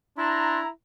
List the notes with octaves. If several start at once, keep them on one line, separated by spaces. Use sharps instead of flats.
D4 E4 A#5 C6